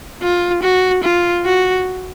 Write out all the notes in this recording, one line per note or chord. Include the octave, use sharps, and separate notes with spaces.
F4
F#4
F4
F#4